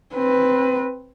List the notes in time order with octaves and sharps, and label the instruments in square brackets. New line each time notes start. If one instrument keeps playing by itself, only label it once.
[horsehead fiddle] C4 B4